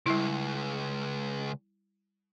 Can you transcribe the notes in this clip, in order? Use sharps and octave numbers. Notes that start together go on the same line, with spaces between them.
C#2 G3 E4